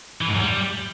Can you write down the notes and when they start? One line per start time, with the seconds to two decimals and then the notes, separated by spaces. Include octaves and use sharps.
0.21 E3
0.28 G#2
0.34 F#2
0.41 G3